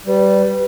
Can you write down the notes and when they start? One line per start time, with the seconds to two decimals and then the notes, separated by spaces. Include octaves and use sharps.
0.06 G3 B4